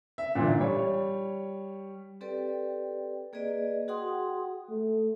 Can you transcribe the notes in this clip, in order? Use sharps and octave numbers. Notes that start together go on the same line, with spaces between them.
E5
G1 A#2 E3 D4 F4
G3 C#5
C4 G4 A4 B4 D5 G5
A#3 G#4 B4 D5 D#5
F#4 G#4 F#5 G5 C6 D#6
A3